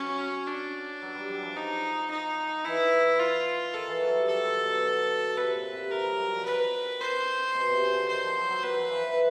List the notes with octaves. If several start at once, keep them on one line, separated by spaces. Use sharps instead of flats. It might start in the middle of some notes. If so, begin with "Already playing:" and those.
Already playing: F#3 C#4
D4
F#3
G3
F#3
F3
D#4
D#4
E3 E4
F4
D#3 A4
E3
F#3
G3
F#3 A4
D3
B2
C3 B4
A#2
C3
D3 A#4
G3
F#3
F3
D#3 B4
C5
B2
C3
C#3
D3
D#3 C5
F3
F#3
F#3
F#3 B4
F3
E3